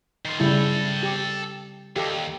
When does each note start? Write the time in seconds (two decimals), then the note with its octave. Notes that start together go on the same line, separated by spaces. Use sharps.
0.25 D#3 F4
0.40 C#3 G3 E4 A4 G5
1.03 G4
1.96 D#2 G4 A4